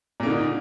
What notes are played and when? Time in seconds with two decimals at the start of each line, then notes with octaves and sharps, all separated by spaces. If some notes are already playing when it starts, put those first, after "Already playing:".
0.20 A#2
0.23 A#3
0.26 D3
0.30 D#4